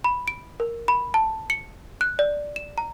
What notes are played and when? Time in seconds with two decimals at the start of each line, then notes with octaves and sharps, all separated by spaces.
0.04 B5
0.28 D7
0.60 A#4
0.88 B5
1.14 A5
1.50 C#7
2.01 F#6
2.19 D5
2.56 E7
2.78 A#5